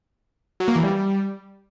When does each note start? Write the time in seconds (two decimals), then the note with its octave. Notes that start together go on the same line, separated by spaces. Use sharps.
0.60 F#3
0.68 A#3
0.76 E3
0.83 G3